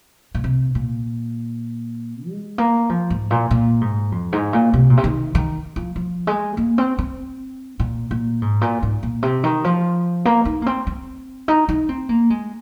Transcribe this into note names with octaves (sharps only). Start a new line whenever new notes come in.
A#2
C3
A#2
G#3
A#3
F3
G#2
A#2
A#2
G#2
F2
G#2
A#2
C3
A#2
C3
D#3
D#3
F3
F3
G#3
A#3
C4
C4
A#2
A#2
G#2
A#2
G#2
A#2
C3
D#3
F3
A#3
D#4
A#3
C4
C4
D#4
D#4
C4
A#3
G#3